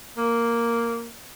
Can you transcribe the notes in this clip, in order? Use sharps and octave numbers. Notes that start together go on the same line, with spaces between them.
A#3